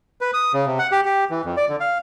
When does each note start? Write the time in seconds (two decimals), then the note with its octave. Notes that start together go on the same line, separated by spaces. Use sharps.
0.21 B4
0.33 D#6
0.53 C#3
0.66 C3
0.79 F#5
0.92 G4
1.05 G4
1.30 E3
1.45 F2
1.57 D5
1.69 D3
1.80 F5